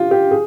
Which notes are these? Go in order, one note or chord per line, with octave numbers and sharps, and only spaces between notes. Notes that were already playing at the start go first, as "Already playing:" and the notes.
Already playing: F4 G4
G4
G#4